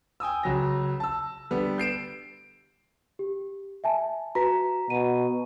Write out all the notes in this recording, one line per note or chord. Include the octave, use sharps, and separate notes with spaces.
G5 G#5 D#6 E6
C#2 F#3 A#6
A5 E6
D3 G3 B3
G6 C7 D7 E7
G4
E5 G#5 A5
F#4 B4 A#5 B6
B2 D#7